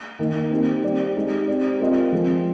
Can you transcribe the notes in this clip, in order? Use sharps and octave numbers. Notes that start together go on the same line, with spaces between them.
D#3 A#3 D#4
C4 D#4 G4
G3 C4 G4 D5
G#3 D#4 G4
C4 G4 D5
G#3 C4 F4 A#4 D#5
F3 G#3 C4